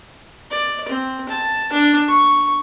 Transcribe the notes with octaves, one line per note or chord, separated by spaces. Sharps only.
D5
C4
A5
D4
C#6